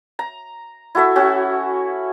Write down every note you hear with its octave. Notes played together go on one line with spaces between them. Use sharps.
A#5
E4 F#4 A4 E5
C#4 F#4